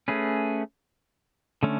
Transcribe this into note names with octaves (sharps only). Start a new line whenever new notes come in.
A3 C#4 G#4 B4
D3 A3 C#4